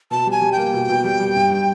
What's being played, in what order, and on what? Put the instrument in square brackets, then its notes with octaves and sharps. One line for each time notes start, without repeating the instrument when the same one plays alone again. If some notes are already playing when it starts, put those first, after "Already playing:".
[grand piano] B2 [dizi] A5
[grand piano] G3 [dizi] G#5
[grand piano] G3
[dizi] G5
[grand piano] A#3
B2
B2
G3
G3
G2
G3